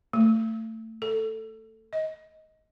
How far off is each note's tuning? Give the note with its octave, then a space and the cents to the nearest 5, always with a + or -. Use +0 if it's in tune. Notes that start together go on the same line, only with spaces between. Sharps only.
A3 +25
A4 +5
D#5 +15